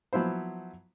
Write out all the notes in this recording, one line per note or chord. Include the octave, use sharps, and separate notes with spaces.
F3 F#3 B3 E4 C5